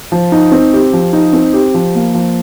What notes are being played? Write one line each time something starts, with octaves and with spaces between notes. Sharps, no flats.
F3
D#4
C4
G4
F3
D#4
C4
G4
F3
A#3
F3